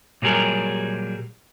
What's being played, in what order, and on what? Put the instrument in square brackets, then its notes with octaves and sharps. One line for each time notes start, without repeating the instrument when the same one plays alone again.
[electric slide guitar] A#2 F#3 G3 G#4 A#4